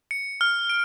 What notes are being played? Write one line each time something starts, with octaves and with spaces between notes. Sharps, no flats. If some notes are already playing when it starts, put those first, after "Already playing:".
C#7
F6
D7